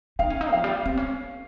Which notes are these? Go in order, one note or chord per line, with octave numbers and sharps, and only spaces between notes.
D#4 F5
C#4
D#4
F3 F5
G3
C4
C#4